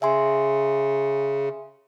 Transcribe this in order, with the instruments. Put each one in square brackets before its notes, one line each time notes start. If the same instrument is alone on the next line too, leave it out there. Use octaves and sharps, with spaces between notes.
[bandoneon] C#3 [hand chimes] E5 G#5 C6